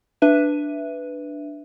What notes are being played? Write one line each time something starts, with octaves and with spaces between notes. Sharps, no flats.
D4 B4 E5 D#7